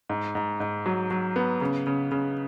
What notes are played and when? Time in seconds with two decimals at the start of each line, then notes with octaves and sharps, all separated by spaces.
0.09 G#2
0.35 G#2
0.60 G#2
0.86 F#3
1.11 F#3
1.36 B3
1.61 C#3
1.87 C#3
2.12 C#3